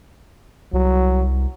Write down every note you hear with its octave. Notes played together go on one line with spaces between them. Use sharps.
C2 F#3